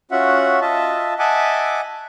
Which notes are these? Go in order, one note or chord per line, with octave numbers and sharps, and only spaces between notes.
C#4 F4 F#4 E5 F#5
F4 D#5 E5 A5
D#5 E5 F#5 G#5 A5 D6